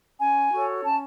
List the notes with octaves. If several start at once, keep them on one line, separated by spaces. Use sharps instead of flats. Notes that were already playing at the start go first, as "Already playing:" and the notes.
C#4 G#5
F#4 A4 C#5
C#4 A5